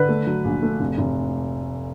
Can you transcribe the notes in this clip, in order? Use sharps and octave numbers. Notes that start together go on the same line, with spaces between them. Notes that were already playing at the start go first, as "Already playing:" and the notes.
Already playing: D3 B4
A3
F#3
A#1
A3
F1
F1